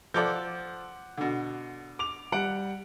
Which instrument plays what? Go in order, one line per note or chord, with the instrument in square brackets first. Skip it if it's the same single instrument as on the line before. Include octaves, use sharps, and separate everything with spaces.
[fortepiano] F3 A4 D5 [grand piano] F#5 D6 G6
[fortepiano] B2 D3
[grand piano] D6 F7
G3 F#5 D7